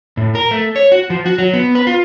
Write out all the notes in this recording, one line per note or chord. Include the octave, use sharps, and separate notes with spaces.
A2
A#4
A3
C#5
F#4
F3
F#4
F#3
B3
B4
F4